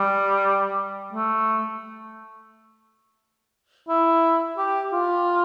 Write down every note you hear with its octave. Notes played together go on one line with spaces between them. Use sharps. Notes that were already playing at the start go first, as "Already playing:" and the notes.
Already playing: G3
A3
E4
G4
F4